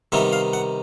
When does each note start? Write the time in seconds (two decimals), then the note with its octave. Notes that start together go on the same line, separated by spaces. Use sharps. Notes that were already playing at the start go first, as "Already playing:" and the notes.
0.12 C3 D#3 G3 B3 D#4 E5
0.33 F5
0.53 F#5